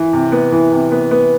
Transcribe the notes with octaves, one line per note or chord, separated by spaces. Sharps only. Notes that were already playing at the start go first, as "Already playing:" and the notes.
Already playing: E3
C3
B3
E3
C3
B3
B3